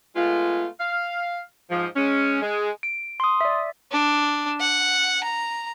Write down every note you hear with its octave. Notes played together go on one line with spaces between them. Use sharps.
G#3 A3 B3 F4
F5
G#2 F3
G#3 C#4
G#3
D7
C6 D#6
D5 E5
D4
F#5
A#5